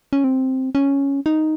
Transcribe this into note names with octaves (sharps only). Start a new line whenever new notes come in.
C#4
C4
C#4
D#4